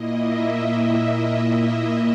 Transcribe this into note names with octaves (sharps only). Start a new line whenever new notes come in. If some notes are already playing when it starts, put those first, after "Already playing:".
Already playing: A#2 A#3 E4 D#5
E5